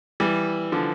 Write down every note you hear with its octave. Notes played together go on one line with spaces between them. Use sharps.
E3 G3
D3 F3